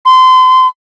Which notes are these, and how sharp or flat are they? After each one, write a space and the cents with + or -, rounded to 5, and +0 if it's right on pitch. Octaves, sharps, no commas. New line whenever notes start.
C6 -25